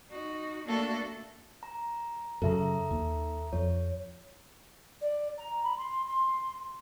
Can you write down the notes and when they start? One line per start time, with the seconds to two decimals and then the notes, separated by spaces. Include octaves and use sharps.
0.10 D#4 F#4
0.66 A3 A#3 D4 F#4 A4 E5
1.63 A#5
2.42 F#2 C#3 A4 E5 A#5
2.91 D#2
3.53 F2 C#5
5.02 D5
5.38 A#5
5.64 B5
5.77 C6
6.08 C6